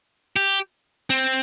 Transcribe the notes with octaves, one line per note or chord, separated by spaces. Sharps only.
G4
C4